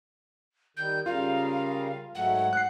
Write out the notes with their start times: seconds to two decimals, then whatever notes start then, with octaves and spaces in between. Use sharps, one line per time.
0.77 D#3 G3 G6
1.06 C#3 G3 F4 A#4 F5
2.15 G#2 F#3 A3 F#5
2.53 F#6 C7